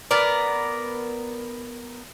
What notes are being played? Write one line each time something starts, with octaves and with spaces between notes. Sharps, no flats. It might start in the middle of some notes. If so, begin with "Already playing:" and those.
B3 A#4 D5